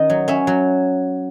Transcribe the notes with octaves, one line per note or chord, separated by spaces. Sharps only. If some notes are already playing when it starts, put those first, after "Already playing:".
Already playing: D#3 C#4 D#5
F#3
C#4 E5
F#3